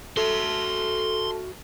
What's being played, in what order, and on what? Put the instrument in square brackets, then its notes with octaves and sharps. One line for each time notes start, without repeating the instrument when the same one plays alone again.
[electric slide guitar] F#4 E5 [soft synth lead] A4 [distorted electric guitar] C6